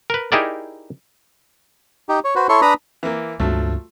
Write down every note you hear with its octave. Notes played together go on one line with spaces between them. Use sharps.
A#4 B4
D#4 E4 G4 G#4 A#4 D5
D#4 G4
C#5
F#4 B4 C5
E4 A4 C#5 C6 C#6
D4 B4 A#5 B5 D#6
E3 A#3
C#2 G2 F3 F#3 A3 D4